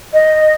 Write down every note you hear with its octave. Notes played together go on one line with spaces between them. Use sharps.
D#5